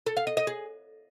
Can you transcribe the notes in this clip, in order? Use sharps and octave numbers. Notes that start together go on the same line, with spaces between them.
A4
F5
D#5
D#5
G#4